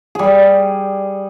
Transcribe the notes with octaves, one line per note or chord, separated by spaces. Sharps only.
G3 G#4